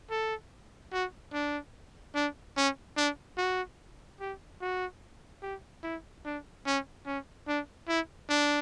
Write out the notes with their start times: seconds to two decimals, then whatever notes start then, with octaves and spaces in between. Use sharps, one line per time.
0.10 A4
0.92 F#4
1.33 D4
2.15 D4
2.56 C#4
2.97 D4
3.37 F#4
4.20 G4
4.61 F#4
5.42 G4
5.83 E4
6.25 D4
6.66 C#4
7.06 C#4
7.48 D4
7.88 E4
8.30 D4